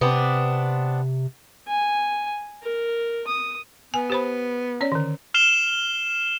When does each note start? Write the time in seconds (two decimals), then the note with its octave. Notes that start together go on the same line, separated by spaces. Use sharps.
0.01 C3 B3 C4 D4
1.68 G#5
2.63 A#4
3.28 D#6
3.94 B3 G#5
4.10 G4 C5 B5
4.81 C#4 C#5 D5
4.92 D3 D#3
5.34 F6 C7 E7 F7 G7